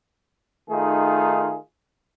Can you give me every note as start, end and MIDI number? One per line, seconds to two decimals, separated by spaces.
0.70 1.57 51
0.70 1.57 57
0.70 1.57 63
0.70 1.57 65
0.70 1.57 68